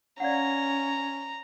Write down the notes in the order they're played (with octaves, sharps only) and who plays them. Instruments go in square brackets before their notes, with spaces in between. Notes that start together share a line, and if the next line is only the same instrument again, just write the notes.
[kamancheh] C#4 [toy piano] D5 F5 F#5 [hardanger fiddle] A#5